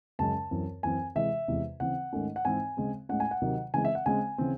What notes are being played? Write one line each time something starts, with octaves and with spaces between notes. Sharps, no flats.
F#2 C#3 G#3 C#4 A5
F#2 E3 C4
F#2 E3 C4 G#5
C3 E3 G#3 E5
E2 C3 E3 G#3
C#3 E3 C4 F#5
G#2 D#3 A3 C#4
F#5
G#2 E3 C4 G#5
C#3 G#3 C4
A2 G#3 C#4 F#5
G#5
F#5
C3 D#3 F#3
C#3 E3 G#3 C4 G#5
E5
F#5
C#3 G#3 C4 G#5
C#3 E3 C4